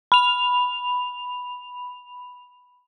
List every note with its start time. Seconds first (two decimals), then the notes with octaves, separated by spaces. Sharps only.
0.12 B5 F7